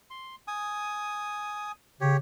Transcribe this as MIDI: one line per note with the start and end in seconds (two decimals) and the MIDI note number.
0.10 0.36 84
0.48 1.72 80
0.48 1.72 87
2.01 2.17 49
2.01 2.17 67
2.01 2.17 73